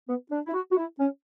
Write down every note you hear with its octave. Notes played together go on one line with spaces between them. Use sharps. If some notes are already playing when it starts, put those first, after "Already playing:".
B3
D4
E4
F#4
F#4
E4
C#4